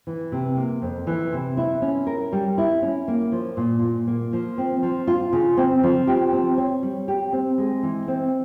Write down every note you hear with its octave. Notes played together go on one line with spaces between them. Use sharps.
E3
C3
A#3
F2
E3
C3
E4
C#4
A#4
G3
E4
C#4
A#3
F3
A#2
A#2
A#3
F3
C4
F3
F4
C#3
C4
F3
G4
C4
C#5
G3
G4
C4
G#3
E3
C4